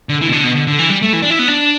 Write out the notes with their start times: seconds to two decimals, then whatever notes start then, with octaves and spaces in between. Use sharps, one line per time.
0.09 D3
0.21 E3
0.28 B2
0.33 D3
0.44 B2
0.56 D3
0.67 D3
0.79 E3
0.90 G3
1.02 A3
1.13 E3
1.22 D4
1.30 E4
1.39 B3
1.48 D4